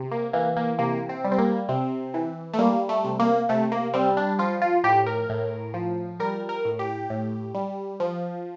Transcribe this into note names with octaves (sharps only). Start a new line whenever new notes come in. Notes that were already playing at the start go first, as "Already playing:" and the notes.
Already playing: C3
A#3
E3 A#3
A#3
C3 A#3
C4
G3
C4
A#3
C3 C4
E3
A3
G3 A#3
A3
C3
A#3
C3 A3
A#3
G3 C4
D4
F3 F4
F4
A2 G4
A#4
A2
F3
G3 A#4
A#4
A2
G4
A2
G3
F3